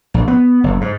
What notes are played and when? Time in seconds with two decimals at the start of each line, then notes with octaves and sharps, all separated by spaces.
0.14 A#1
0.28 B3
0.64 F#1
0.81 G#2